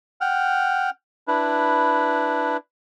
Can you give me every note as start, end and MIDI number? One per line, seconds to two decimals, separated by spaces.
0.21 0.90 78
0.21 0.90 79
0.21 0.90 89
1.28 2.57 62
1.28 2.57 64
1.28 2.57 71